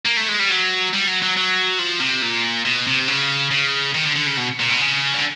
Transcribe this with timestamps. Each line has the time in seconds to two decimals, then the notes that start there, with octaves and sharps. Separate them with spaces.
0.05 A#3
0.17 A3
0.28 G#3
0.39 G3
0.49 F#3
0.93 G3
1.07 F#3
1.22 F#3
1.37 F#3
1.79 F3
2.00 C3
2.22 A#2
2.65 B2
2.87 C3
3.08 C#3
3.51 C#3
3.94 D#3
4.06 D3
4.16 D3
4.27 C#3
4.37 B2
4.60 A#2
4.70 B2
4.81 C#3
5.13 D3